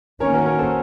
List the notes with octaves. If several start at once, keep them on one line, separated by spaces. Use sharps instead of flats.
D#3 A#3 C#4 A#4 C#5
F#4 A#4
A#4 C#5
A4 C5